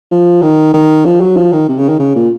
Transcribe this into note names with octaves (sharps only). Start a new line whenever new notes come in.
F3
D#3
D#3
F3
F#3
F3
D#3
C3
C#3
D#3
C#3
A#2